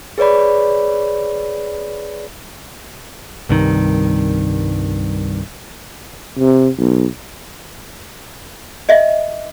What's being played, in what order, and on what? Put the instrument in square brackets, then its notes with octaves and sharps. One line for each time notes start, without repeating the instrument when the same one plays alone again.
[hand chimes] G#4 B4 C#5 D5 B5
[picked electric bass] C2 G2 C3 D#3
[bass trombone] C3
B1
[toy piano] D#5 E5